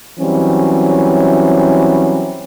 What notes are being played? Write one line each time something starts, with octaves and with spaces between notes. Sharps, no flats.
E3 F#3 G3 C4 C#4